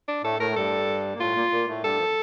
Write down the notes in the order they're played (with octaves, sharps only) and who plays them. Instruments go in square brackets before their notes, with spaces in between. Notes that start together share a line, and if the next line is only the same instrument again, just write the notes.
[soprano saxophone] D4
[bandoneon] A2 A3 [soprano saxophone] A4
[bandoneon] A2 A3 [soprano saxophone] A#4
[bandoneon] A3
[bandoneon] G2 G3 [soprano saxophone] A4
[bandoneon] A#3
[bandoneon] A2 A3 [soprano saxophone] F4
[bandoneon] A#2 A#3
A#2 A#3
A2 A3
[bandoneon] G2 G3 [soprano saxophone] A4
[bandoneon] F3